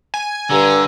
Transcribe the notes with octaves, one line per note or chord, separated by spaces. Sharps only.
G#5
G2 D3 A#5